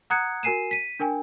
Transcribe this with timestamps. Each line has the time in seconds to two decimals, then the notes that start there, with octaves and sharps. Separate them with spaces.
0.10 F#5 A#5 D#6 F#6 G#6 C#7
0.43 F#4 A#4 G#5 C7 D#7 E7
0.71 B6 D#7
1.00 D4 A#4 G5 G#5